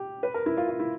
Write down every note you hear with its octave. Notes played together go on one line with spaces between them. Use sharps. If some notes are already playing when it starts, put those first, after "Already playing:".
Already playing: G4
B4
A#4
E4
F4
F4
E4